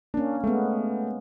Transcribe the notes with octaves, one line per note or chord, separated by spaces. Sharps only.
A#3 C#4 D4
G#3 A3 B3